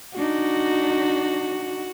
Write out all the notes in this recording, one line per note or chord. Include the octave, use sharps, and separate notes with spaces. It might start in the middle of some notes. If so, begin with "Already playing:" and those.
D4 D#4 F#4